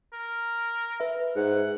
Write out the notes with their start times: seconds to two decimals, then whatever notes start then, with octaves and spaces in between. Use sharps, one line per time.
0.13 A#4
1.00 B4 E5
1.36 G#2 F#5